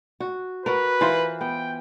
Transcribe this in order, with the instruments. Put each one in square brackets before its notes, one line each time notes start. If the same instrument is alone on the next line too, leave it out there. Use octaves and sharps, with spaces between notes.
[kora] F#4
[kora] F#4 A#4 [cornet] B4
[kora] E3 F4 C5
[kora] B3 [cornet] G5